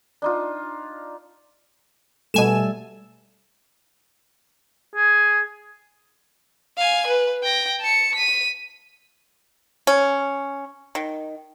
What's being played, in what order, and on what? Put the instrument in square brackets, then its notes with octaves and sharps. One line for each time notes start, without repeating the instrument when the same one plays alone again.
[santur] D4 D#4 F4
[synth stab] B2 G#5 E7 [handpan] G3 A3 A4
[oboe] G#4
[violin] F5 G#5
B4
G5 A#6
A5 C#7
B6 D#7
[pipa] C#4
D#3